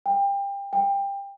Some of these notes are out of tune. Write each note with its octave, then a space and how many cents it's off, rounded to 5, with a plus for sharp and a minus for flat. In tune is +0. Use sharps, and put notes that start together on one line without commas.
G5 +25
G5 +20